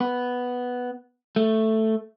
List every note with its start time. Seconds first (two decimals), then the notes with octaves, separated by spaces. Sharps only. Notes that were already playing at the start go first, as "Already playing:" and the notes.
0.01 B3
1.36 A3